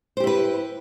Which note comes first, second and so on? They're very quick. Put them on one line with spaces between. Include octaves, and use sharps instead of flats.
C5 G4 E4 B4